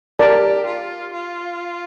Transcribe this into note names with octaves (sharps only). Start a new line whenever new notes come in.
G4 A#4 D5 A5
F4
F4